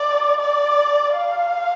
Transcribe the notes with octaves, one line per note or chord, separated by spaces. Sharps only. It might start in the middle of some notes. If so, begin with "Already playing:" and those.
Already playing: D5
D5
F5